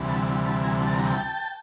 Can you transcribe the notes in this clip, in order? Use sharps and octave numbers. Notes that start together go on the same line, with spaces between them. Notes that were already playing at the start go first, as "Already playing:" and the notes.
Already playing: D2 C3 E3 G3
A5 B5
A5 B5
G#5 A#5
A5
A#5
G5 A5